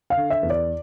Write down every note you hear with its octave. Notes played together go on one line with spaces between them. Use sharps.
F5
D3
E5
E2
D5